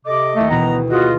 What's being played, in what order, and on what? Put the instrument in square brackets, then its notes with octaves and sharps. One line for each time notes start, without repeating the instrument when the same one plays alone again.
[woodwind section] C3 A4 D6 [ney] D#5
[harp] D#2 E4 C#7 [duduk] A3
[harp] D2 B2 E3 [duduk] B3 [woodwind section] A#5
[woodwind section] A#3 G#4 D#5 [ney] F4 [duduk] F#4